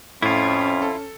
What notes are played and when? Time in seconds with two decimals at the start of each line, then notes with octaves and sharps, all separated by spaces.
0.22 F2 A2 C#4 E4 F4
0.82 A4